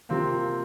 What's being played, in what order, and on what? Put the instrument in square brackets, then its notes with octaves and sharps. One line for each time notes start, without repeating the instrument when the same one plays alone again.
[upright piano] C3 F3 A#3 [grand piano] C4